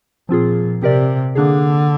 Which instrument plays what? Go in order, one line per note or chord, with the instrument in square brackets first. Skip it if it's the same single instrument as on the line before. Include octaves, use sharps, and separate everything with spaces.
[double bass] A#2 [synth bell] F3 C4 F4 G#4
[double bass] C3 [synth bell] C4 G4 A#4 D5
[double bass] D3 [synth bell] A#3 D4 G#4